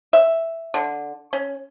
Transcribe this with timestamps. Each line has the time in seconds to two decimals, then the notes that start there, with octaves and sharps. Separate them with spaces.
0.13 E5
0.74 D3
1.33 C#4